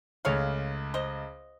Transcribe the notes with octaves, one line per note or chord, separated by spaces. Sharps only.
C#2 C#3 A3 C#5 F5
C5 D#5